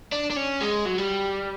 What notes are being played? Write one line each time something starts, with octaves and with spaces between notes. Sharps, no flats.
D4
D4
C#4
G#3
F#3
G3